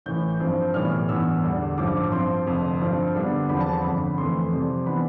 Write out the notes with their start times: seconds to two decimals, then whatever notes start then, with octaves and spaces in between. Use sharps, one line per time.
0.06 A1 A2 E3 G6
0.40 G2 F3 C4
0.74 B1 A2 E3 G3 F6
1.09 A1 G2 E3 B3 E6
1.43 E2 D3 G3
1.77 A1 G2 F3 D6
2.12 G2 F3 C4 C6
2.46 F1 F2 D3
2.80 G2 F3 C4
3.15 G2 D3 G3 B3 D4
3.49 E2 D3 F3 C4 B5
3.61 A5
3.74 B5
3.84 G1 F2 D3
4.17 F2 E3 A3 C6
4.52 F2 C3 G3
4.86 E3 B3 D4 B5